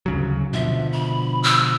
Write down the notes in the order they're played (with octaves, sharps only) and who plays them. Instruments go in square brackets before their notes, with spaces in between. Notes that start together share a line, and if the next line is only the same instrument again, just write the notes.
[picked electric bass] D2 C#3 F#3
[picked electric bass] B2 D3 F3 [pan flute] E5
[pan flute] B5
E6